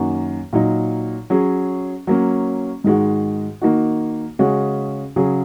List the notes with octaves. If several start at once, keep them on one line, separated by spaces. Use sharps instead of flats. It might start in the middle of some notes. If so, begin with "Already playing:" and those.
Already playing: F#2 D#3 A#3 F#4
A#2 F#3 D#4
F#3 C#4 G#4
F#3 A#3 C#4
G#2 D#3 G#3 F#4
D#3 A#3 D#4 F#4
C#3 G#3 C#4 F#4
C#3 F#3 C#4 G#4